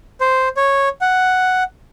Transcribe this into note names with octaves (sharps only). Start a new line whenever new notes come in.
C5
C#5
F#5